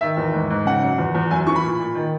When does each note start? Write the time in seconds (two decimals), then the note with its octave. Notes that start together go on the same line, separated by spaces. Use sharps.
0.01 D#3 E5
0.17 E2
0.34 G#2
0.50 G#2
0.66 C#3 F#5
0.83 F#2
0.98 E2
1.15 E2
1.31 F#2 G#5
1.47 E3 C#6
1.56 B5
1.63 A#2
1.80 A#2
1.95 D#3